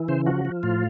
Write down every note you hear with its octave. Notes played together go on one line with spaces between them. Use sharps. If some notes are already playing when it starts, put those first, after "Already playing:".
Already playing: E3
C#3 C5
F3 F#4
F3
A2 F4